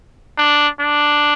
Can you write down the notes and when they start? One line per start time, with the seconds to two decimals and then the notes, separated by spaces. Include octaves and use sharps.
0.38 D4
0.80 D4